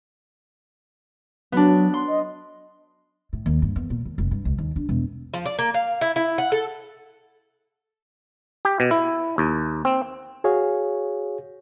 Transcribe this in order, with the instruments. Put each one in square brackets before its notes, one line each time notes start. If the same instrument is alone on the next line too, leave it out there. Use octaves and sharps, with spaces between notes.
[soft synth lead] F#3 [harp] B3 D4
[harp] C6
[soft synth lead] D#5
[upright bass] A2
D#2
G2
E2
A#2
D#2
F1
G2
C#2
D#2
D4
E1
[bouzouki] F3
D5
A#3
F5
E4
E4
F#5
A4
[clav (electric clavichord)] G4
B2
E4
D#2
C4
[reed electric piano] F#4 G#4 C#5 F5